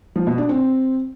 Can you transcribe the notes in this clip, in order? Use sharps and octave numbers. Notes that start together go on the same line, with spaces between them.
F3
B2
D4
C4